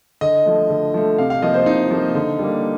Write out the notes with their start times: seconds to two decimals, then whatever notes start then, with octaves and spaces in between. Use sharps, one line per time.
0.21 D3 D#5
0.45 F3 A3
0.70 D3
0.94 F3 A3
1.18 C3 F5
1.30 F5
1.42 F3 A#3 D#5
1.54 C5
1.66 C3 D#4
1.91 F3 A#3
2.15 D3
2.39 G3 A#3